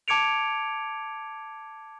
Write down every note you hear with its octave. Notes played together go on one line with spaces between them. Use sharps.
A5 D6 G#6 C#7 D7 F7